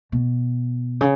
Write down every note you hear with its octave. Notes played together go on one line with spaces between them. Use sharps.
B2
C#3